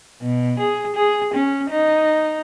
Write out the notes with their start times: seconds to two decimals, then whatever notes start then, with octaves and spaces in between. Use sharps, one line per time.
0.21 B2
0.59 G#4
0.96 G#4
1.34 C#4
1.70 D#4